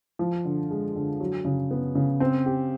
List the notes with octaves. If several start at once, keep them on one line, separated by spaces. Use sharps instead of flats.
F3
D3
G#3
D3
F#3
C#3
B3
C#3
C4
G4